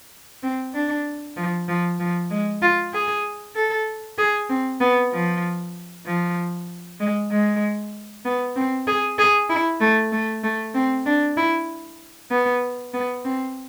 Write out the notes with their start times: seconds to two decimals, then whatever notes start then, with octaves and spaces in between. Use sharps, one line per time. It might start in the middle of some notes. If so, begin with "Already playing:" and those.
0.43 C4
0.74 D4
1.37 F3
1.68 F3
2.00 F3
2.31 G#3
2.62 F4
2.94 G#4
3.55 A4
4.18 G#4
4.50 C4
4.81 B3
5.12 F3
6.06 F3
7.00 G#3
7.31 G#3
8.25 B3
8.56 C4
8.87 G#4
9.18 G#4
9.50 E4
9.81 A3
10.12 A3
10.44 A3
10.75 C4
11.06 D4
11.37 E4
12.31 B3
12.93 B3
13.25 C4